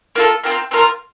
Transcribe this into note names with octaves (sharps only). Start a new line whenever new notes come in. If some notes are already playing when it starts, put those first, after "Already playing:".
A#3 F4 A4
C4 F4 A#4
C4 F4 A#4